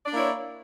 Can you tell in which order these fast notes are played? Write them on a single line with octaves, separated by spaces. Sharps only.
D5 D4 A#3 E4 C#5